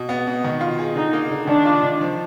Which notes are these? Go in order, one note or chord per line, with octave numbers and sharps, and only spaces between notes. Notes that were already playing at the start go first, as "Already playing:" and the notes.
Already playing: B2
B3
B2
D#3
F4
G#4
D3 D#4
A#3
D3
D#3 D4
F4
D#3
F3